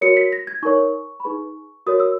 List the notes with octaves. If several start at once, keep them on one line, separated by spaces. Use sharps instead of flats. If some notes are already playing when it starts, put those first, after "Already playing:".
F#4 A#4 C#5 C#7
B6
A#6
G#6
D#4 A#4 C#5 C#6
B5
D#4 G#4 B4 C#6
F#4 A#4 C#5 D#6
E6